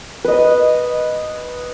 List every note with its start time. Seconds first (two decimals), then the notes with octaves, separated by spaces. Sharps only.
0.24 B4 D#5